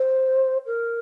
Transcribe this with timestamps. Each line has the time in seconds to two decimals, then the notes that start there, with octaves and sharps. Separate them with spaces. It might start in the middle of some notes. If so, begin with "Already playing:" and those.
Already playing: C5
0.66 A#4